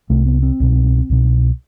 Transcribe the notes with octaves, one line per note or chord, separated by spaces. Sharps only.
C2 C3 A3
B3
C4
C2 B2
C2 B2